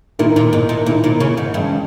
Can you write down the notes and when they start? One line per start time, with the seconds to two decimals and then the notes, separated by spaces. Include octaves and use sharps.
0.19 A#2 D#3 A#3 E4
0.36 A#2
0.53 G#2
0.69 A#2
0.86 A#2 D#3 A#3 E4
1.04 A#2
1.20 C#3
1.37 G#2
1.54 G2 E3 G#3 C#4